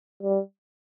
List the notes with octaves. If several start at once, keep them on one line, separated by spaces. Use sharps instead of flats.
G3